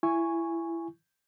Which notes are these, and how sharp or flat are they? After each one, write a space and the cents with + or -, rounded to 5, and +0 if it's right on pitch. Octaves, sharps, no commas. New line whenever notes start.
E4 +20 G#5 -5 C#6 +0